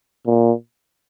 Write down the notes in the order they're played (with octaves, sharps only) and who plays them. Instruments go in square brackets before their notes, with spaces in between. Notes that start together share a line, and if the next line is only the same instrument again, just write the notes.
[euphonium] A#2